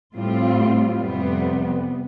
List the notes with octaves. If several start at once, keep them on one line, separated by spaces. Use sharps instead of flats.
A2 G3 C4 F4
F2 C3 G3 B3